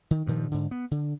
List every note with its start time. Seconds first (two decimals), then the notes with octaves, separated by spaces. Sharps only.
0.11 D#3
0.27 G2 A#2 D#3 F3
0.51 G#2 D3
0.71 B3
0.91 D3